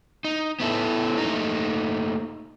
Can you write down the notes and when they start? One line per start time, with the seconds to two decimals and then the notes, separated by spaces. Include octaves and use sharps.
0.25 D#4
0.60 B3 C#4 E4 G4 A4
1.18 A3 A#3 D#4